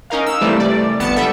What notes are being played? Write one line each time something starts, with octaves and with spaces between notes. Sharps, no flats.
C#4 D#4 A#4 F5
E6
C3 E3 G3 A3
D5
G1 B3 A5 C#7
G3 A4 E5